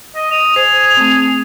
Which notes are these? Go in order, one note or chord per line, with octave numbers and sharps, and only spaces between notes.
D#5
D#6 F7
G#4 C5
A3 C4